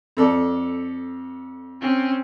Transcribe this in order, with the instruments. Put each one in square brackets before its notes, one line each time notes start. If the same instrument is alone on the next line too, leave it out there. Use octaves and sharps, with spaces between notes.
[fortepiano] F2 A4 D5
[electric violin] C4 C#4